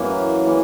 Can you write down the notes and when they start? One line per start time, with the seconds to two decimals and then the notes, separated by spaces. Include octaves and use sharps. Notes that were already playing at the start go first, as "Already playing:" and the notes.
Already playing: F#2 E3 A#3
0.46 E3 A#3